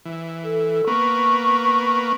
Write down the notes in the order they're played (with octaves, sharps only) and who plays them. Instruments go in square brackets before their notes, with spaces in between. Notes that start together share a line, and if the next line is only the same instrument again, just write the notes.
[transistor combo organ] E3
[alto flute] A4
[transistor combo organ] A#3 B3 [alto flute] C#6